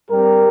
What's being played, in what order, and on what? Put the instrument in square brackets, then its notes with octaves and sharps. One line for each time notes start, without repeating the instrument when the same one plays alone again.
[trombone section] G2 G3 C4 G4 A#4